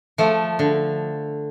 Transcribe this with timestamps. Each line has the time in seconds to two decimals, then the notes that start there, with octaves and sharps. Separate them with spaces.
0.18 F3 A3
0.59 D3